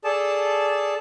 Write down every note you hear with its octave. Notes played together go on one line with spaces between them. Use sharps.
G#4 A4 D5 A5